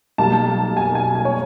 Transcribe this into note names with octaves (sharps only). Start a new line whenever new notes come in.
B1 B2 G3 A#3 A5
G#5
G#5
G#5
C#5